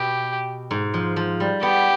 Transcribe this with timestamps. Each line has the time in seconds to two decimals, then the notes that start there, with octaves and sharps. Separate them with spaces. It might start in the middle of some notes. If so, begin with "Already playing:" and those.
Already playing: B2 G4
0.71 G#2
0.94 F3
1.16 F3
1.40 G3
1.63 B3 G4